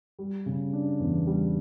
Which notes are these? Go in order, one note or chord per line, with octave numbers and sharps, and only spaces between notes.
G3
C#3
D4
E2
G3